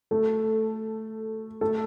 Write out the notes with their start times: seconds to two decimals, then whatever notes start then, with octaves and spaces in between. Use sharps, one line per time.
0.11 A3 A4
1.61 A3 A4